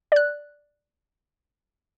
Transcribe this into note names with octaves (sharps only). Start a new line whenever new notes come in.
D5 F#6